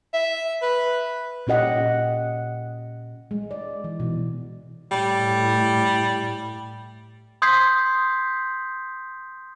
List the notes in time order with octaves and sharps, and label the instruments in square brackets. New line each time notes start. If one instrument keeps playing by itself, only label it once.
[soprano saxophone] E5
B4
[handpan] A#2 C#4 G4 D#5 F#5
G#3
D5
E3
B2
[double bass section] A2 [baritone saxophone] G3
[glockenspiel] C6 D#6 G6 G#6 B6 C7